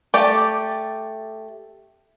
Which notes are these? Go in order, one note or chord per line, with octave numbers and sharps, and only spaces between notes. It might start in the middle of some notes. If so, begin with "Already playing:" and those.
A3 G4 D5